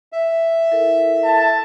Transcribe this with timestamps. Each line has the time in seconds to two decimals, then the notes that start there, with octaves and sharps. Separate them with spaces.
0.12 E5
0.71 E4 A4 A#4
1.25 A5